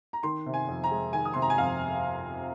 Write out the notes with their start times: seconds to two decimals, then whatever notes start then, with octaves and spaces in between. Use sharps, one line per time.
0.13 A#5
0.23 D#3 C6
0.46 C3
0.54 G#5
0.68 F2
0.84 A#5
0.91 G#3
1.13 D#3 G#5
1.25 D#6
1.33 C3 C6
1.42 A#5
1.50 G#5
1.58 F2 F5